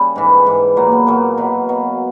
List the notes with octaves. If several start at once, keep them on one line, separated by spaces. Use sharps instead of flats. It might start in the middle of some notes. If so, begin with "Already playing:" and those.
Already playing: C#3 G3 A#3
G#2 E3
G#2 E3
A#2 F#3 A#3
B3
A#2 F#3 A#3
B2 F#3
B2 F#3